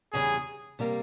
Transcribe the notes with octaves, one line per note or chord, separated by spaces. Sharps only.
E2 C#3 G3 G#4
C3 G3 A#3